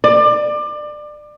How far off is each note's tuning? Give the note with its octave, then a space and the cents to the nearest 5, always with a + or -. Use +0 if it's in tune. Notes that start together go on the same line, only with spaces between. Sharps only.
D5 +25